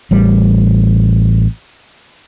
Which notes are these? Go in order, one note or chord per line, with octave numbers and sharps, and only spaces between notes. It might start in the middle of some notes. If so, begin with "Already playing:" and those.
A1 G3